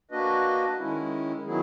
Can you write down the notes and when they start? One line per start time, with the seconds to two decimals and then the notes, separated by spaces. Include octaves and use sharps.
0.11 A#3 D4 F#4 B4 D#5
0.78 D#3 G#3 C#4 E4
1.45 D#3 F#3 B3 E4 G#4